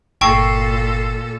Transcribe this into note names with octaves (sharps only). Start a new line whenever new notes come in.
G1 A#2 A4 G5 A5 C#6 E6 C7